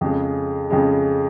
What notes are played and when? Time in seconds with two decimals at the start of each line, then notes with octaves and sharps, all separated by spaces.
0.01 F2 C#3 G#3
0.70 F2 C#3 G#3